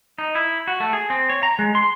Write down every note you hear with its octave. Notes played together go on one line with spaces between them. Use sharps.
D#4
E4
F#4
A3
G#4
C4
C#5
A#5
G#3
C6